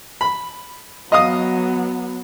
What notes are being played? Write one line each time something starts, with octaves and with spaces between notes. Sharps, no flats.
B5
F#3 B3 D#5 F5 D#6